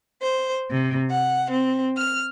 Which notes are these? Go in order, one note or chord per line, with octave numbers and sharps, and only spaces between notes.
C5
C3
F#5
C4
F6